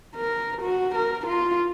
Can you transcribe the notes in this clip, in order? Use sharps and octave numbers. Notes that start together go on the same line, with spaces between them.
A#4
F#4
A#4
F4